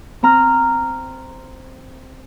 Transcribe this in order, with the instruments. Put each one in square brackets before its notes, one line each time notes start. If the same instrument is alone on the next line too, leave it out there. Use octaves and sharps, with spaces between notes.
[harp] C4 A#5 F6